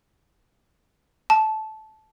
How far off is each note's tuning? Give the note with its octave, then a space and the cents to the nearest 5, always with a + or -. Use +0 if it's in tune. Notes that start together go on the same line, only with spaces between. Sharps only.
A5 -15